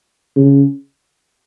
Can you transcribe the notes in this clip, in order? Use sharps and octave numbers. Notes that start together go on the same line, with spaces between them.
C#3